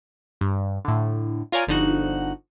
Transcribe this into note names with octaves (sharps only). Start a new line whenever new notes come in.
G2
A2 D3
F4 A#4 C#5 D5 G#5
G1 D3 F3 D#4 F#4 F#6